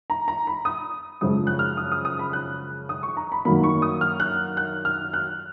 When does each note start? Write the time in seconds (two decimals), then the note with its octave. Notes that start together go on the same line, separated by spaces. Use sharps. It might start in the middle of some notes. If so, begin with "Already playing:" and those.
0.10 A#5
0.28 A#5
0.47 B5
0.65 D#6
1.21 F#2 C#3 F3 G#3 D#6
1.47 F#6
1.59 F6
1.77 D#6
1.92 D#6
2.05 D#6
2.19 B5
2.33 F#6
2.89 D#6
3.03 C#6
3.17 A#5
3.32 B5
3.45 F#2 D#3 F#3 A#3 B5
3.64 C#6
3.82 D#6
4.01 F6
4.20 F#6
4.57 F#6
4.85 F6
5.13 F#6